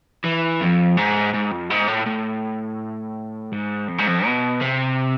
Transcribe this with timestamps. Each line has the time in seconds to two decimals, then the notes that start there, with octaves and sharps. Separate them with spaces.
0.25 E3
0.61 F2
0.97 G#2
1.34 G#2
1.52 F2
1.70 G#2
1.88 A2
2.06 A2
3.52 G#2
3.88 F2
3.98 G#2
4.07 F2
4.25 B2
4.61 C3